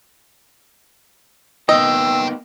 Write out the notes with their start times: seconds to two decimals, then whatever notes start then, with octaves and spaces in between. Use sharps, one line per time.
1.69 A#3 B3 D#4 B4 D#5 G5 E6